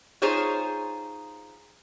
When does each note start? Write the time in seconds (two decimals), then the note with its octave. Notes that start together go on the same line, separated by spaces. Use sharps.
0.22 D#4 F4 G#4 C5 C#5